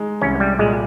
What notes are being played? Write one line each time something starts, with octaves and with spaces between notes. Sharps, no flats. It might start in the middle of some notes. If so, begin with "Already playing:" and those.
Already playing: G#3 D#4
C2 C#4
G3
A#2 G#3